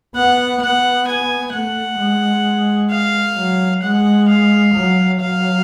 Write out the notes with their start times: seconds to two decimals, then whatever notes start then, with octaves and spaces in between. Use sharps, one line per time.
0.15 B3 F#5
0.62 B3 F#5
1.07 G#5
1.53 A3 F#5
2.00 G#3
2.91 F5
3.37 F#3
3.83 G#3 F#5
4.28 F5
4.75 F#3
5.21 F#3 F5